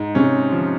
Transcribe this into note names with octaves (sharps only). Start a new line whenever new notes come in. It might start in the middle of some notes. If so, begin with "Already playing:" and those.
Already playing: G#2
C3 C#4
F3